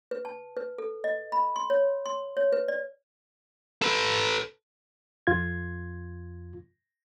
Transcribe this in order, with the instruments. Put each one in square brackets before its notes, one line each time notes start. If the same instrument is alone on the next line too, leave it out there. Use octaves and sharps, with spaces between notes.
[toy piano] B4
A5
B4
A4
D#5
B5
C6
C#5
C6
C#5
B4
D5
[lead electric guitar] A4 B4
[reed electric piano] F2 F4 G#6